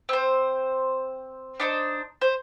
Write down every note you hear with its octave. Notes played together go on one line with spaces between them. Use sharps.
C4 C5
D4 D#4 C5
C5